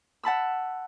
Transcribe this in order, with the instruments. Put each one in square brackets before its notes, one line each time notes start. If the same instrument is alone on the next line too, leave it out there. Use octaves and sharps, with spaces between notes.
[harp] F#5 A5 B5 E6